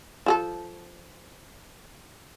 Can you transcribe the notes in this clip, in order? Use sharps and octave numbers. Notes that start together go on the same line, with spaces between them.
F3 G#4 A4